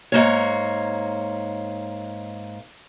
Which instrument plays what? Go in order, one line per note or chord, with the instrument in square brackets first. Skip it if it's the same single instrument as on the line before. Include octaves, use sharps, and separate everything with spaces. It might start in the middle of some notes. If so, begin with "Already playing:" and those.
[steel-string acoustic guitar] G#2 A#3 C#5